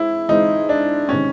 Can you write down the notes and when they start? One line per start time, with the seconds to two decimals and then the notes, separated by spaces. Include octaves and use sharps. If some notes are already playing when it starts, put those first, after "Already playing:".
Already playing: E3 G#3 C4 E4
0.29 E3 G#3 C4 D#4
0.69 D4
1.09 C3 D#3 G#3 C4 C#4 D#4